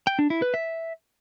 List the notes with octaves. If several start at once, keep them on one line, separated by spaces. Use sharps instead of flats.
G5
D4
E4
B4
E5